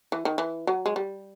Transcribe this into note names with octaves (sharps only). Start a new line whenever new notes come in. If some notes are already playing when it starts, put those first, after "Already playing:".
E3
D#3
E3
F#3
G#3
G3